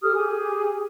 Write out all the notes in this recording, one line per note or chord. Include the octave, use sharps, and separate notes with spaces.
G4 A4 D#6 F6
G4 G#4 G#5